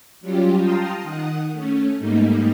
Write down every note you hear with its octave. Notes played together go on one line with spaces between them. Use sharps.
F#3 G3 C#4 F4 G4
F5 G5 A5 A#5 C6 D#6
D#3 F#5 D#6
A3 C#4
G#2 G3 A3 A#3 D#4